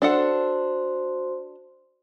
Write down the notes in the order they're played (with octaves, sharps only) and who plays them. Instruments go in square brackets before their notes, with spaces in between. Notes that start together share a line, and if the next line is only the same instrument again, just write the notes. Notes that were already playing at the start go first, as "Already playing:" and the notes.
[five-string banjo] D4 A4 F#5 [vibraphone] F#4 C5 C6